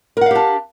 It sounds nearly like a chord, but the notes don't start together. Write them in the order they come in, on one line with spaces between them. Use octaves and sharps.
A#4 F#5 F5 G4 D4